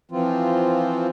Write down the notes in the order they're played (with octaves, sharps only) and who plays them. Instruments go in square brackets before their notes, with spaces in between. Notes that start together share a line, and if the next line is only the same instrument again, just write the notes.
[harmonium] E3 F3 C4 F4